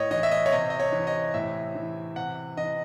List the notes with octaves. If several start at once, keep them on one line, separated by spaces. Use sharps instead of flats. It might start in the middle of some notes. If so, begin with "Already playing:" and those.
Already playing: A2 C#5 D#5
E3 D#5
E5
D#5
C#5
C3 D#5
D#5
C#5
E3
D#5
A2 E5
E3
C3 F#5
E3 D#5